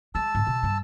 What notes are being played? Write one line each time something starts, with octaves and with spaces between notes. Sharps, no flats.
G#3 A5 E6
G#2 D#3
B2
G2 G3